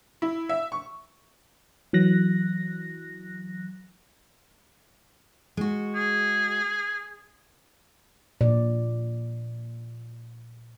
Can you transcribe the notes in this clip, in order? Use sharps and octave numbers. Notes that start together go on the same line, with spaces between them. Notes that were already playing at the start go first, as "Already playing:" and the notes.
E4
E5
C#6
E3 F#3 F#6 A#6
G#3 F#4
G#4
A#2 D5